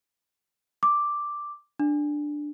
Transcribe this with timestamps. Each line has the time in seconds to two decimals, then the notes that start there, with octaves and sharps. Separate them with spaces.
0.83 D6
1.80 D4